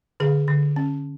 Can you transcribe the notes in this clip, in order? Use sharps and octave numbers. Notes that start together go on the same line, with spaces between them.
D3 G#4
D3
C#4